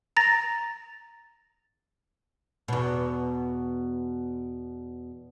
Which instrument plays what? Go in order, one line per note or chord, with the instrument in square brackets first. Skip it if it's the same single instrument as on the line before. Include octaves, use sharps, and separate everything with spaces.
[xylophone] A#5 A6 A#6
[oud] E2 B2